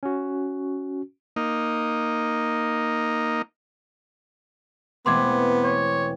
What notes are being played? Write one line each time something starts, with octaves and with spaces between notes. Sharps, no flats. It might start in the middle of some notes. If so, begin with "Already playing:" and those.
C#4 F#4
A#3 D#4
E1 A3 B3 C4 C6 D6 G#6
C#5